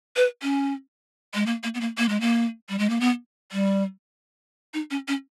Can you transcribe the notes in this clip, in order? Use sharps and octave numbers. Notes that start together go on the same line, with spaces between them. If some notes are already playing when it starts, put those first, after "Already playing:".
B4
C#4
G#3
A#3
A#3
B3
A#3
A#3
G#3
A#3
G3
G#3
A#3
B3
G3
D#4
C#4
C#4